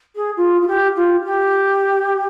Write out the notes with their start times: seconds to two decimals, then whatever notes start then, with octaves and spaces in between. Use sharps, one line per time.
0.15 G#4
0.37 F4
0.61 F4
0.67 G4
0.96 F4
1.21 F4
1.24 G4